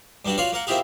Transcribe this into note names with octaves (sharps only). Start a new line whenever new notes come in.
G2 G3 D4 F#4
F4 F#4 C#5 D5 F5
A#3 A#4 F#5
A#3 C4 E4 F4 G4 G#4